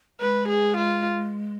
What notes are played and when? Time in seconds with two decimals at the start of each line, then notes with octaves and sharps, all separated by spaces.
0.20 G#3 B4
0.49 G#4
0.78 F4